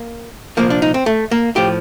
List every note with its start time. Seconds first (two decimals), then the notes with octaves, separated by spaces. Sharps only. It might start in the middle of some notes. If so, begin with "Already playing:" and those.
Already playing: A#3
0.57 C2 A#2 F3 A#3
0.70 D4
0.82 D#4
0.94 C4
1.06 A3
1.31 A#3
1.56 A2 F3 G4